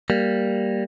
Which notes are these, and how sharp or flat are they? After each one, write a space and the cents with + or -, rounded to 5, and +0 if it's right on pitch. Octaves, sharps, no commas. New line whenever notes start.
G3 +0 A#3 +0